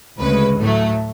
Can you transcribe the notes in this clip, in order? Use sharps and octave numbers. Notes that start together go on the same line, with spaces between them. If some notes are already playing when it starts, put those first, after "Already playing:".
D2 C#3 G#3 B4
A2 F#3 A3